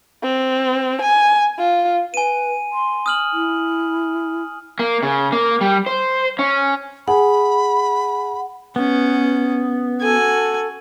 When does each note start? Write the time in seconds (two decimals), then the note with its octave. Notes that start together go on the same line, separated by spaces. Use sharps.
0.23 C4
1.02 G#5
1.58 F4
2.14 B4 G#5 D#7
2.73 C6
3.06 D#6 F6 F#7
3.33 E4
4.79 A#3
5.03 C#3
5.32 A#3
5.61 G3
5.86 C5
6.39 C#4
7.08 G#4 F#5 B5
8.76 B3 C#4
10.02 F#4 A4 G#5